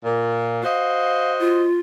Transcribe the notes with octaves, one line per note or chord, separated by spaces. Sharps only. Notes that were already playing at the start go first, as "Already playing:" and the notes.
A#2
F#4 C5 D#5 F5
F4